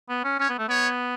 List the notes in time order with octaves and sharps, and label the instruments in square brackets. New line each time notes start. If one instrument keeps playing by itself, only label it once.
[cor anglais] B3
C#4
[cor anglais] C#4 [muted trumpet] C#5
[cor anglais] B3
A3
[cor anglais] B3 [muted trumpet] C#5